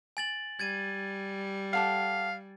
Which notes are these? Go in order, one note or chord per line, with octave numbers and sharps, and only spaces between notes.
G#5 A6 F#7
G3 G#6 A6 D#7
G4 A4 F5 F#5